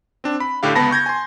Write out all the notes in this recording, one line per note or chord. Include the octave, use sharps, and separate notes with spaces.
C4 D4
B5
A2 D3 G4 F5
C#2 B3 A5 B5 A#6
C#6 G6 G#6 A#6
G#5 C6